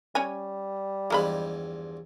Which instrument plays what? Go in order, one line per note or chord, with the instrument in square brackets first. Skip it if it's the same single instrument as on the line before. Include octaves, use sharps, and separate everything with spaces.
[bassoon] G3 [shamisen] C#4 C#5 G#5
[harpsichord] E2 G2 F3 [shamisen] G#3 A#4 B5